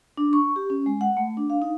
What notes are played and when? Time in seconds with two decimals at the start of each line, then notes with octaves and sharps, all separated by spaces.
0.17 D4
0.33 C#6
0.56 G4
0.70 C#4
0.86 G#3
1.01 F#5
1.17 A3
1.37 D4
1.50 F5
1.62 D#4